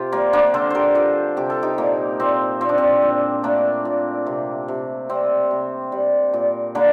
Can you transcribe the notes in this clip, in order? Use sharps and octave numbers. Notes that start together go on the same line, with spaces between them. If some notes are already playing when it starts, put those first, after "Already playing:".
Already playing: C3 F4 G4 C5
G3 A#3
A#3 D4
D3 A4 C5
G4 A#4 C5
G3 F4 A4
C3 G4
A4
D#4 G4
A#2 A#3
A#2 C4
A#2 C4
D4
C4
A#2
A3 A#3 D4
A#2
C3
C3
G3 C4
C3
G3
A#2
D3 A#3 D4